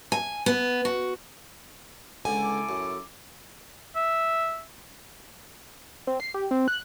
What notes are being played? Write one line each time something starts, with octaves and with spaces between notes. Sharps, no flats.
G#5
B3
F#4
C#2 D3 E4 A4 G#5 D6
F#2
E5
C4
C7
G4
C4
F#6